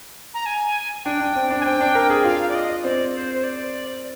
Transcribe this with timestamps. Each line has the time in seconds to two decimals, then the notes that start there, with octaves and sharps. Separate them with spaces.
0.34 A#5
0.46 G#5
1.05 D4 G5
1.21 D4
1.35 C4
1.50 D4
1.61 G#5
1.65 C4 G5
1.81 D4
1.95 A#4
2.10 G#4
2.24 F4 F5
2.49 D5
2.55 D#5
2.84 C4 D5
3.14 C5
3.34 C5
3.44 D5